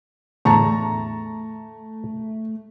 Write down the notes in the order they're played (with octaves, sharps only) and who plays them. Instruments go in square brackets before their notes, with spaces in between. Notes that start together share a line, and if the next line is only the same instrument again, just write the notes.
[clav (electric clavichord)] E2 A2 D3 [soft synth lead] A3 [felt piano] A5 C#6 [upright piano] A#5